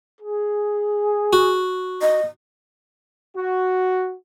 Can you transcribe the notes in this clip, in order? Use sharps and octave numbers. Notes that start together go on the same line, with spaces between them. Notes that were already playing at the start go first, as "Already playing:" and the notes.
G#4
F#4
D#5
F#4